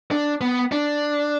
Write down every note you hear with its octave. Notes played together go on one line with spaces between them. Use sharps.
D4
B3
D4